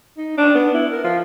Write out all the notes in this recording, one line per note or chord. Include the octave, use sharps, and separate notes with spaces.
D#4
D4
B3
E4
A#4
F3